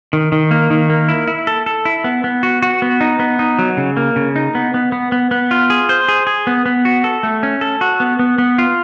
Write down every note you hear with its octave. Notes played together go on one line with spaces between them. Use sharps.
D#3
D#3
A#3
D#3
A#3
E4
E4
A4
A4
E4
B3
B3
F#4
F#4
B3
D#4
B3
D#4
F#3
C#3
A#3
C#3
D#4
B3
B3
B3
B3
B3
F4
G#4
C5
G#4
G#4
B3
B3
F#4
A4
A3
C#4
A4
F#4
B3
B3
B3
F4